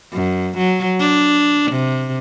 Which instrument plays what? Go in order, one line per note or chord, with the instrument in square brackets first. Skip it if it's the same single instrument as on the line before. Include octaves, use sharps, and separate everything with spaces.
[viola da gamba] F#2
F#3
D4
C3